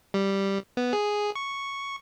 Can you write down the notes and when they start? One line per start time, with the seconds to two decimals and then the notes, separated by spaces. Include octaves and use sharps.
0.14 G3
0.77 B3
0.93 G#4
1.36 C#6